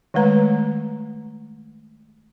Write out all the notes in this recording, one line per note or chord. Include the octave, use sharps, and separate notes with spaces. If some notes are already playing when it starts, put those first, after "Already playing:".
D#3 G#3 A3 B4 A#5